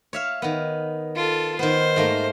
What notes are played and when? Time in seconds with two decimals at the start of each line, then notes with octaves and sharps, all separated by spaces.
0.13 C#5 E5 F5
0.42 D#3 B3
1.15 F4 A4
1.59 D#3 B3 C5
1.96 G#2 A3 A#3